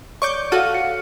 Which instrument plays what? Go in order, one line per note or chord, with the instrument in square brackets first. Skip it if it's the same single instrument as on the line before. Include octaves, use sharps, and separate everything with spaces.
[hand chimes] C#5 D5 [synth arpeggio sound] C#6 D6 G6
[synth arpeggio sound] F#4 A4 D#7 [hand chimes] F5 F6
[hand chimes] C#7